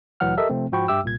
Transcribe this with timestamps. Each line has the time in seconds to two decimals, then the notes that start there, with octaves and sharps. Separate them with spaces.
0.20 D2 A#2 E3 F#3 F#5 F6
0.37 G4 A4 A#4 D#5 E5
0.50 C3 F3 A3 C4
0.72 G#2 F3 F#4 G5 B5 C#6
0.88 G2 G4 E5 G5 D6 E6
1.04 C2 A#2 G#6